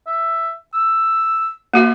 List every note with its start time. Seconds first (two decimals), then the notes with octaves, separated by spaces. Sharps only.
0.07 E5
0.74 E6
1.73 A#3 F#4 E5